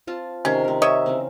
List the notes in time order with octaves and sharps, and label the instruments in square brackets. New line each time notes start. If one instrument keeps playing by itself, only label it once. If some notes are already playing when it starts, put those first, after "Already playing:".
[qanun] C4 F4 A5
[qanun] C3 D#3 C6 [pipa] C#4
[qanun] C4 A#4
[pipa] C#5 D#5 E5
[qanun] C#3 E3 C4